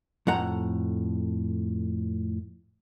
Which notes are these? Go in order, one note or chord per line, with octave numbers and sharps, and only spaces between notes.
F2 A2 F#5 A#5